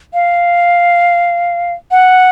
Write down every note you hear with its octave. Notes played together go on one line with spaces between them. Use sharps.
F5
F#5